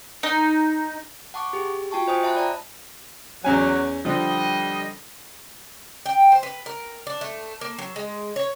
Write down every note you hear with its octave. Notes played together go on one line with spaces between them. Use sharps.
D#4
F#5 A5 C#6 D6
G4 G#4
F4 F#4 G5 A5 C#6
F4 C5 D#5 G5 G#5 D#6
E5 A5 B5 F#6
D5 A5 A#5
E2 F#3 C#4 G#5
D3 F3 G3 D#5
G5
C5
B4
A#4
D4
A3
A#3
F#3
G#3
C#5